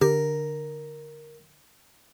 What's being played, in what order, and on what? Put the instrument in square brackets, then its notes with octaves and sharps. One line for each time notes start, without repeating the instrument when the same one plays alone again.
[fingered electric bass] D3 [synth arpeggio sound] G4 [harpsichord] A#4